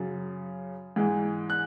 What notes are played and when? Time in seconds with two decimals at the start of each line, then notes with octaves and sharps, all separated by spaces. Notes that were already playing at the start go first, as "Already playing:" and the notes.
Already playing: F#2 C#3 F#3 A6
0.96 G#2 E3 G#3
1.50 F#6